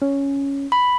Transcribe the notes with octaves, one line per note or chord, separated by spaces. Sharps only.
C#4
B5